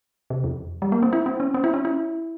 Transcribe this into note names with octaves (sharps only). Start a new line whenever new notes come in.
C3
F2
G3
A#3
C4
E4
C4
C#4
C4
E4
C#4
E4